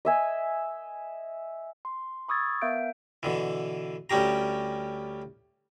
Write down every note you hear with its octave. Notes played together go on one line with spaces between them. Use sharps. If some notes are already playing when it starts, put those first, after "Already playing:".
D#5 E5 G#5
C6
B5 C#6 D#6 E6 G#6 A6
B3 A#4 E5 F5 G6 D7
B2 D3 E3
D2 G3 C#4 G4 A#5